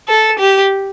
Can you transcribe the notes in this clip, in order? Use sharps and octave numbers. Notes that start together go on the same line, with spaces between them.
A4
G4